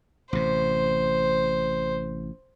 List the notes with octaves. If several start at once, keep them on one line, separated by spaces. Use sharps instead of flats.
A1 C3 C5